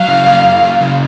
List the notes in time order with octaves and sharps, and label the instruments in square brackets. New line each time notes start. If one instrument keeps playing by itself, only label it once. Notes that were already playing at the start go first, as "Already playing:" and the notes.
Already playing: [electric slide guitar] F#3 [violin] F5
[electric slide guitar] C#3
A#3
F#2
F#3
C#3